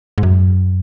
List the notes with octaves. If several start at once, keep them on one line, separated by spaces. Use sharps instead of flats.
G#2
F#2